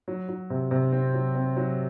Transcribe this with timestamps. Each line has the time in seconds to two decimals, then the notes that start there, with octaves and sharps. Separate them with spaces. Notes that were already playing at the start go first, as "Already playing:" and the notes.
0.08 F#3
0.29 F#3
0.50 C3
0.71 C3
0.92 C4
1.14 F#3
1.35 C4
1.56 F#3